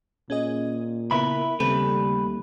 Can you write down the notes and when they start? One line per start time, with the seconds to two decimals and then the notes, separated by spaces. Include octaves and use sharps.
0.30 A#2 C#4 G#4 D#5
1.11 C#3 B3 E4 A#4 B4 E5 B5
1.60 D#2 C#3 G3 A3 C4 A4 B4